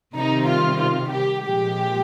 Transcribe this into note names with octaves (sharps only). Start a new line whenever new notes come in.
C3 D#3 G3 D#4
F4
F4
G4
A#2 F3 G#3 G4